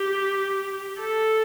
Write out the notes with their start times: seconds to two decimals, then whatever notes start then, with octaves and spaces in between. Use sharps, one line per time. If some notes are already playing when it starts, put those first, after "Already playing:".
Already playing: G4
1.00 A4